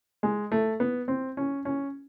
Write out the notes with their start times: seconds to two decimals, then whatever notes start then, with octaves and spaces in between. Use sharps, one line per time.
0.23 G#3
0.52 A3
0.80 B3
1.08 C4
1.37 C#4
1.65 C#4